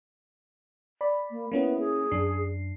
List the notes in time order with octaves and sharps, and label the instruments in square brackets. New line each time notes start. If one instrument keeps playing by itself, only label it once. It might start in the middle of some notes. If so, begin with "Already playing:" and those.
[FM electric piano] D5 B5
[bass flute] A#3
[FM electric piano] A#3 C#4 E4 [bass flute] B3
[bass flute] G#4
[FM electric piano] F#2 D4 C7